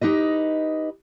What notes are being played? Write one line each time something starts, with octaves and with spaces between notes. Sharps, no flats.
D#4 G4 B4 D#5